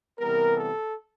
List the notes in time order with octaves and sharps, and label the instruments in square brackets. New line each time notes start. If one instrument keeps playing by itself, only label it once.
[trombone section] C3 E3 G3 B3 A#4
A4